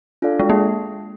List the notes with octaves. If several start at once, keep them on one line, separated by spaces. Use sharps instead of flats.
D4 F4 A4 D5 F5
G#3
A#3